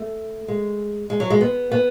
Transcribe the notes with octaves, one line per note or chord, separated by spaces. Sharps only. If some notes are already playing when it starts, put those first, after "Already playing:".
Already playing: A3
G#3
G#3
F#3
G#3
B3
B3